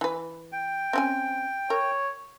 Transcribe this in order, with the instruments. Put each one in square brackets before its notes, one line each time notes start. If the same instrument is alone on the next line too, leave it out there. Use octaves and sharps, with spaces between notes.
[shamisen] E3 B4
[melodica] G5
[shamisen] C4 C#4 G#5
[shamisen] A#4 [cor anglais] C#5